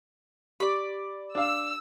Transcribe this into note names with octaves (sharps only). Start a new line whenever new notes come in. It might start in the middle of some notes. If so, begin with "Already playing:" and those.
G4 D5 B5
D4 F5 E6